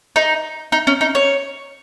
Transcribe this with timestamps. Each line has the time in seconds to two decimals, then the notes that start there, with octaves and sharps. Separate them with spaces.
0.16 D#4
0.72 D#4
0.87 C#4
1.01 D#4
1.15 C#5